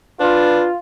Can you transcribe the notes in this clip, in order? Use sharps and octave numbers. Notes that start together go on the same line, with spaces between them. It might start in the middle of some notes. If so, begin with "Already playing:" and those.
D4 F4 B4